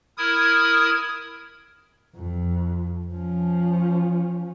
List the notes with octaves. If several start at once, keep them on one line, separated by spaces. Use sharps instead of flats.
E4 A#4 D#6 G#6
F2
F3 C#4